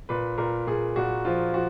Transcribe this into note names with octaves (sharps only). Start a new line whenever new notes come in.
A#2 B4
A#2 A#4
A#2 G#4
A#2 F#4
F3 F4
F3 F#4